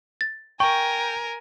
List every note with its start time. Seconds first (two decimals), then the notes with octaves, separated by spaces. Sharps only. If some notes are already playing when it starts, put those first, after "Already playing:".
0.21 A6
0.60 A#4 G5 G#5 C#6